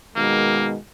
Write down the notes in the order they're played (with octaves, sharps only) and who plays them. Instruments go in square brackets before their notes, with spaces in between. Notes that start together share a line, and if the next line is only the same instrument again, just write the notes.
[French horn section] B2 D#3 G#3 [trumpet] A#3